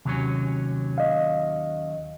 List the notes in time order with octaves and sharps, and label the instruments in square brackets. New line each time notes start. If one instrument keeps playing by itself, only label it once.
[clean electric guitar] D#2 F#3 C#4 [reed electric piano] C3
[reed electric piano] D#5 F5